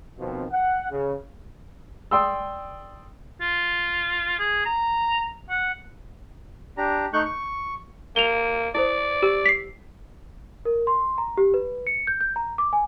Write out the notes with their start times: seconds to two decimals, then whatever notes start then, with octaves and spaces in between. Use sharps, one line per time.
0.20 B2 D#3 F3 C4
0.52 F#5
0.91 C#3
2.11 D5 G5 C6 D#6 E6
3.41 F4
4.39 G#4
4.66 A#5
5.50 F#5
6.78 D4 G4 A#5
7.13 A3 D#4 C#6 F#6 G6
7.25 C#6
8.16 A#3 F7 G7
8.75 E4 A4 C5 D5
9.23 G4 E6
9.46 B6 C7
10.65 A#4
10.87 C6
11.18 A#5
11.37 G4
11.54 B4
11.87 C#7
12.07 G6
12.21 G6
12.36 A#5
12.58 D6
12.73 G#5